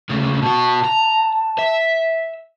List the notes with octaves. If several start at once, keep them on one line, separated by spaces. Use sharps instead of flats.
D2 C#3
B2 F#4 A5
A#5
E5